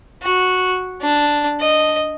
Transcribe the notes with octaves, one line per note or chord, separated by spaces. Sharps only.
F#4
D4
D#5